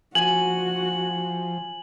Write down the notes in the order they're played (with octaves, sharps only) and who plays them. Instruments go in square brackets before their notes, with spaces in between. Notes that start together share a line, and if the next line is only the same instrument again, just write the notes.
[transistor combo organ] F3 [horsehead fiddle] F#4 [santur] G#5 [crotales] F#7